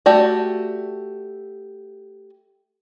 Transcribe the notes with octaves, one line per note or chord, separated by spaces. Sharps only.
A3 F#4 G4 D5